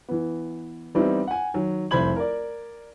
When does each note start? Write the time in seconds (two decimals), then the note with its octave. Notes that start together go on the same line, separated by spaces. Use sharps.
0.09 E3 B3
0.95 E3 G3 B3 C4 D#4 E4
1.27 F#5 G#5
1.54 D#3 F#3
1.91 F1 C2 C5 B5 G#6 F#7
2.16 A#4 D5